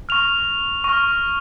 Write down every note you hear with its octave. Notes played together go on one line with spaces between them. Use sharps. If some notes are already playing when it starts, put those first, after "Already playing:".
C#6 F6 F7
C#6 F6